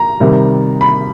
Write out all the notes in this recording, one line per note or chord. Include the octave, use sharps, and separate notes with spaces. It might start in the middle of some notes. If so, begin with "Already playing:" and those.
Already playing: A#5
C3 D#3 G3
B5